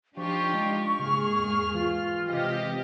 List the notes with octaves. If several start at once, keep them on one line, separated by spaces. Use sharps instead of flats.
F3 D4 D#4 F4 G4 C#6
G#3
G#2 C#3 A#3 G#4 F6
E2
E3 F4
C3 G#3 G4 D#5